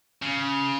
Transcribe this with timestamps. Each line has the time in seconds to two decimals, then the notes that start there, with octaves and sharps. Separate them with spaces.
0.22 C#3